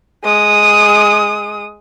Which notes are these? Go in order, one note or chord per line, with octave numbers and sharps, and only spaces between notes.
G#3 D#6